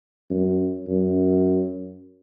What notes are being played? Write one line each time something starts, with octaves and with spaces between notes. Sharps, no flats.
F#2
F#2